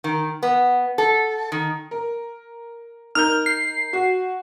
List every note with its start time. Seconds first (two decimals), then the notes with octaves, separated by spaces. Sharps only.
0.04 D#3
0.43 B3
0.98 A4
1.52 D#3
1.91 A#4
3.15 D#4 A#4 F6 G6
3.46 C7
3.93 F#4